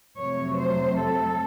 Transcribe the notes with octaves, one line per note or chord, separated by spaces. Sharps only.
F2 C3 F#3 A3 C#5
C5
A4